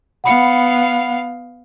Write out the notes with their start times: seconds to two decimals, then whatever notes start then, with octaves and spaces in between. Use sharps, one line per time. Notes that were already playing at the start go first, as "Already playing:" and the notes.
0.24 B3 F5 F#5 B5 C#7